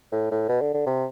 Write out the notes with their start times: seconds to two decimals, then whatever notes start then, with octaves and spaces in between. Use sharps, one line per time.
0.12 A2
0.31 A2
0.49 B2
0.62 D3
0.74 D3
0.86 C3